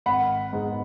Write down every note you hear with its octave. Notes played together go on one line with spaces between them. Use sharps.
G#1 F#5 B5
G#2 G#3 B3